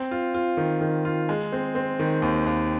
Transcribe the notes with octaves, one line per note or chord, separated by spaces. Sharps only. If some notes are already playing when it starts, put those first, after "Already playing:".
Already playing: C4
F4
F4
D#3
D#3
F4
G#3
C4
C4
D#3
D#2
D#2